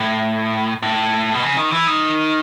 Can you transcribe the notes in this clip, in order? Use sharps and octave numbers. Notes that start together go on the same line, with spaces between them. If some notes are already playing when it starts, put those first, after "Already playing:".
Already playing: A2
A2
B2
C#3
D#3
E3
D#3